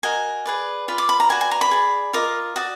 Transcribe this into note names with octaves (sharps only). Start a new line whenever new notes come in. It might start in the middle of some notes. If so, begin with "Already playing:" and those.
F#4 A#4 D#5 G#5
G#4 B4 D5
F4 B4 D5
D6
B5
A#5
F#4 B4 D5 G#5
G#5
A#5
B5
G#4 D5
F4 A#4 D#5 D6
F#4 D5 D#6